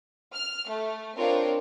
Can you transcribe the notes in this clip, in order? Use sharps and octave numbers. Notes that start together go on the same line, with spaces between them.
F6
A3
C4 D4 F4 A#4 C#5